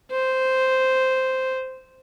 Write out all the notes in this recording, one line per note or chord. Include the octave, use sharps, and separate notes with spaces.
C5